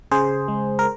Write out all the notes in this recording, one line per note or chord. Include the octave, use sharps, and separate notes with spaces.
C#3 G#4 C5
G#3
A#4